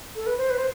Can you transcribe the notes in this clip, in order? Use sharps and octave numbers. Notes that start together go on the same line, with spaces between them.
A4
B4
C5
B4
C5